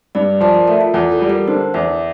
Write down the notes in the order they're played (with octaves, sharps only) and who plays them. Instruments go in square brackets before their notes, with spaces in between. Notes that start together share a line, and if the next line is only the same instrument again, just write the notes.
[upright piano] G2 [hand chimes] D5
[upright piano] F3 [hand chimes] D5
[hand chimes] A#4
[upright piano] A3 [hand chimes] A4
[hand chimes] F4
[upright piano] E2 [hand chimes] F4
[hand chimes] A4
[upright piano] G3
[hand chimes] A#4
[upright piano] D3 [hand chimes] C5
[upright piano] E2 [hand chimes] E5